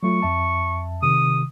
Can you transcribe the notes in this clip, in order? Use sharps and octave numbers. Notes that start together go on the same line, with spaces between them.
F#3 A3 F4 C#6
F2 E5 A5
C3 D#3 D#6